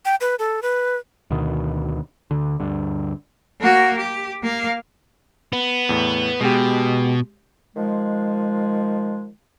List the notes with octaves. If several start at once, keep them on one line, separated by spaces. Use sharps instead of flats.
G5
B4
A4
B4
D2 B2 D#3
D2 D3
D2 G2 D3
A#3 F#4
G4
A#3 F5
B3
E2 A2
B2 G#3 G4
D#3 F3 G#3